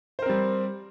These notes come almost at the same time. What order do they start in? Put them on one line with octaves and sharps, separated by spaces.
C5 A#4 C4 G3